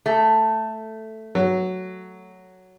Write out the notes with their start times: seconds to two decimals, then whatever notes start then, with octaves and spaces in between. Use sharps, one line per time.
0.06 A3
1.35 F#3